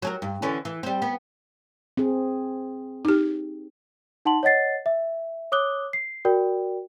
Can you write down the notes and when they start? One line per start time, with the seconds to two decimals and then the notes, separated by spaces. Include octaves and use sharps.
0.02 F#3 G#4 A#4
0.22 G2
0.42 D3 E3 C#4
0.65 E3
0.83 G3 C4
1.02 B3
1.97 C4 G#4
3.05 D#4 G4
4.25 D#4 F#5 A5 C6 F#7
4.43 C#5 D#5 F#5 A6 C7
4.86 E5
5.52 C#5 D6 D#6 F#6 G7
5.93 C7
6.25 F#4 A#4 D5 G5